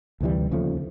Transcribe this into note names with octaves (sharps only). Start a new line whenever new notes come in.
D2 C3 E3 G3
D#2 C#3 F3 A3